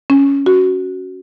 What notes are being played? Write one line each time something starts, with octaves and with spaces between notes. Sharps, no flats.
C#4
F#4